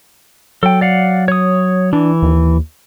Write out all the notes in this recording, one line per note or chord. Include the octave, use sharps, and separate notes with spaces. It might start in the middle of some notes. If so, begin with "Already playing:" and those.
F#3 A4 G5
D5 F5 F#5
C#5 D#6
E3 D4
D#2